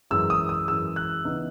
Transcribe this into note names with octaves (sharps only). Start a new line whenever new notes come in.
F#2 E3 G#3 E6
D#6
D#6
F#2 E3 G#3 E6
F#6
C#3 E3 B3 D#4